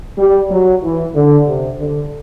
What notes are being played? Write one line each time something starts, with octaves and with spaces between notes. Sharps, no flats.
G3
F#3
E3
D3
C3
D3